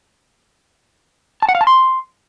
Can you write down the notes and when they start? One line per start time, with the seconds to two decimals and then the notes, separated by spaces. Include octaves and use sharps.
1.42 A5
1.49 F#5
1.55 F5
1.61 A5
1.67 C6